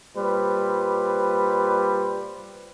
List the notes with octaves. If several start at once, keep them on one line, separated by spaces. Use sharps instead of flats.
A#2 G3 B4 C5